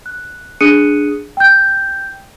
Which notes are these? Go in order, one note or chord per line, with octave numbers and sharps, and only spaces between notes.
F#6
D4 G#4 D#6 F#6 C#7 D#7
G5 G6